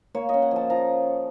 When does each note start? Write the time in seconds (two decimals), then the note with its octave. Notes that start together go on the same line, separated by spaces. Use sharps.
0.14 A#3 C#5
0.29 C#4 D#5
0.42 F#5
0.51 F3 A5
0.70 F3 A#5